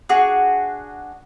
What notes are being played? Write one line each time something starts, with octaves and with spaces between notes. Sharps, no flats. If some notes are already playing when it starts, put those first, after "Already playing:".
D4 F#4 G#4